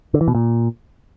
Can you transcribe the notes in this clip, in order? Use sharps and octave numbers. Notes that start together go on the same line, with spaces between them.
D3
E3
B2
A#2